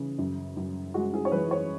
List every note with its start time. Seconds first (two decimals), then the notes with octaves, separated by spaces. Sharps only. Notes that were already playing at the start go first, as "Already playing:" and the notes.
Already playing: C#3 E3
0.18 F#2
0.57 F#2
0.94 G#3 F#4
1.14 G#4
1.25 C#5
1.32 E3 B4
1.51 C#5